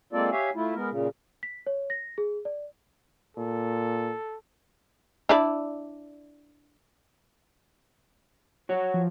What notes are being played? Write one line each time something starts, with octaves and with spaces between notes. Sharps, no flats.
G#3 A#3 C4 F4 A4 D5
G4 C#5 E5 F5 G#5
A3 E4 F4
G#3 B3 A#4
A#2 C#3
B6
C#5
A#6
G#4
D5
A#2 A4
D4 E4 D5
F#4 C#5
F3